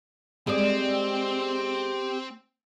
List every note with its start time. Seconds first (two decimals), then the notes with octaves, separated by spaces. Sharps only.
0.47 G#3 C4 G4 D5